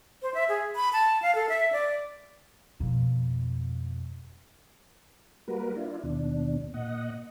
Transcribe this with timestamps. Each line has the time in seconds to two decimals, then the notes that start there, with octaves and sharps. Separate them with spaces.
0.22 C5
0.34 E5
0.49 G#4
0.76 B5
0.93 A5
1.22 F5
1.35 A4
1.49 E5
1.72 D5
2.80 F2 B2
5.48 G3 A#3 F#4 A#4 B4
5.75 D4 E4 F4
6.03 D#2 B2 D4
6.74 A#2 D#5 F#5